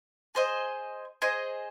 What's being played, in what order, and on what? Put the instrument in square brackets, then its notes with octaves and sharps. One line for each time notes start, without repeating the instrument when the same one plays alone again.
[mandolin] G#4 C5 D#5
G#4 C5 D#5